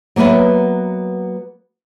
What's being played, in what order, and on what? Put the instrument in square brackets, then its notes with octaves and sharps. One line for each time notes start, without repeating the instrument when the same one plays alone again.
[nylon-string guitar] F#3 A#3 B3 B4 E5